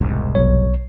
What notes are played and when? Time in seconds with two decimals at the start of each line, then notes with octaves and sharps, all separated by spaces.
0.01 E1 C2 G#2
0.35 B1 C#5